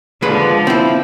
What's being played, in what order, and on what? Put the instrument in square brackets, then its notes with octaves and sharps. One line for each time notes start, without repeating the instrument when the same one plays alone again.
[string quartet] D3 F3 [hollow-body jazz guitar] G#3 B4
[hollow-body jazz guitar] C4 E4